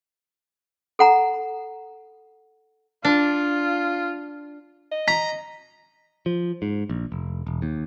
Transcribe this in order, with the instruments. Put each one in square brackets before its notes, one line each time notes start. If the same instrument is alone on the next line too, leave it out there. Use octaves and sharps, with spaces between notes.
[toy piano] A4 F#5 A#5
[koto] D4 [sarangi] F4
[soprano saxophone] D#5
[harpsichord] A#5 [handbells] B6
[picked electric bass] F3
G#2
A#1
F1
E1
D#2